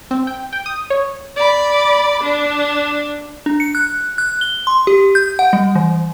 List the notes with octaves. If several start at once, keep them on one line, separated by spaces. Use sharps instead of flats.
C4
G5
G5
D#6
C#5
D5 B5
D4
D4
C#7
F#6
F#6
G7
C6
G4
G6
F#5
G3
E3